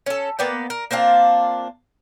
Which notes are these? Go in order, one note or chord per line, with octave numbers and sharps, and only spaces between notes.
C#4 A4
A#3 B3 D5 G5
A#4
A#3 C4 D4 F4